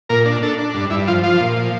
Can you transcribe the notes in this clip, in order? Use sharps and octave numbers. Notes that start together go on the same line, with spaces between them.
A#2 A#4
D4
D4 A4
D4
G2
G2 E4
F3 F4
F3 F4
A#2
F3